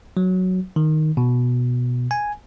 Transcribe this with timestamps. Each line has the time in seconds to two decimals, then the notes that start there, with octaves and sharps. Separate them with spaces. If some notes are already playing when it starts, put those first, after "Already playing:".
0.17 F#3
0.76 D#3
1.17 B2
2.11 G#5